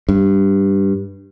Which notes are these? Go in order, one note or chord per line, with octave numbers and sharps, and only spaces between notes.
G2